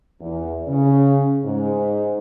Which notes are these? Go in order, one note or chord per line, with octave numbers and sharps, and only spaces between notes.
E2
C#3
G#2